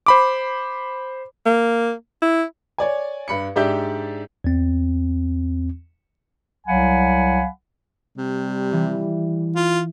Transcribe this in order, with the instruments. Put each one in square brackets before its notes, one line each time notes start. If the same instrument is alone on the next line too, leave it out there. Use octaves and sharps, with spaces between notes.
[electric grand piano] C5 B5 D6
[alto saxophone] A#3
E4
[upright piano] C#5 D5 G#5
G2 B5 C#7
G#2 D4 G4 D5 E5 G6
[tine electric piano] E2 C4
[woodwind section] C2 F#3 F5 F#5 G#5 B5
[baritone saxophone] C3 [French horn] G3
[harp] E3
[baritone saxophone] F4